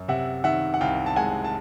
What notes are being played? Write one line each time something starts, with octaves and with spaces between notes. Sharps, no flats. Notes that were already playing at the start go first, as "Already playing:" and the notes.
Already playing: F#2
C3 E5 F#5
D#3 E5 F#5
F#5
C2 F5 G5
A5
G#3 F#5 G#5
A5